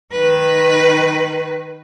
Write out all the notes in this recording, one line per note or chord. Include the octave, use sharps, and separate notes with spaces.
D#3 B4